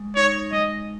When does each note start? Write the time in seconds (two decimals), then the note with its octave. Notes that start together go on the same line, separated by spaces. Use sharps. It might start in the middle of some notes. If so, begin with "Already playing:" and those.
Already playing: G#3
0.16 D#4 C#5
0.52 G#3 D#5